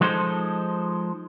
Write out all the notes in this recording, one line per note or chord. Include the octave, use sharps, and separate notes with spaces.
F3 G#3 D#4 A4 C5